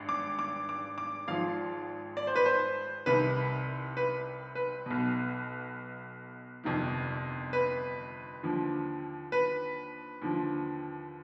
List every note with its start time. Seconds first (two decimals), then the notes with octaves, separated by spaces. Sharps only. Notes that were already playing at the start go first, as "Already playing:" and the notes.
Already playing: G#1 G2
0.09 D6
0.39 D6
0.69 D6
0.98 D6
1.28 G#1 G#2 F3 F5
2.17 D5
2.27 C5
2.36 B4
2.46 C5
3.06 C2 C3 D#3 B4
3.97 B4
4.55 B4
4.86 B1 B2
6.64 G1 F2 C3 D#3
7.53 B4
8.43 D#2 D3 F3
9.32 B4
10.22 D#2 D3 F3